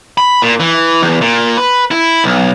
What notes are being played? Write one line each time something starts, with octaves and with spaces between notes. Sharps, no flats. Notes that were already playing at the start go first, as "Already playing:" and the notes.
B5
A#2
E3
E2
A#2
B4
E4
B1